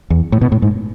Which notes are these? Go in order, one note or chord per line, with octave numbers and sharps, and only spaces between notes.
E2
A2
B2
A2
G#2